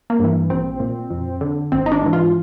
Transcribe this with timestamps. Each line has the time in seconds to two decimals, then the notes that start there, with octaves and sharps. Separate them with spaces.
0.10 A#3
0.19 G2 E3
0.50 A#1 C4
0.80 A#2
1.10 F2
1.41 D3
1.72 G#1 C4
1.86 D#4
1.92 D4
2.02 G#2 E3
2.13 F4